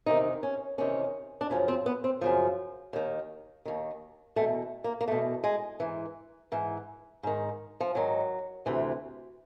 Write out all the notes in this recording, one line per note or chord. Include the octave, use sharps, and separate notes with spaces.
E2 C3 D#3 D#4
C#4
E2 C3 D#3 C#4
D4
F#2 C#3 F3 C#4
C4
B3
C4
F#2 C#3 F3
D#2 D#3
D#2 D#3
E2 B2 A3
A#3
A#3
E2 B2 A3
G#3
G#2 E3
G#2 E3
G#2 D#3
F3
G#2 D#3 F#3
D2 C3 E3